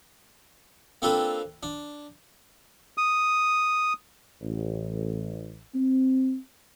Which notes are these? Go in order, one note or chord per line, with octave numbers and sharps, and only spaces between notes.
A#3 C4 D4 F4 A4 B4
D4
D#6
A1
C4